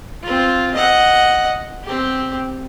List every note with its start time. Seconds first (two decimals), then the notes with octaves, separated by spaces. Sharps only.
0.22 C4 F4
0.74 D#5 F#5
1.84 C4 G4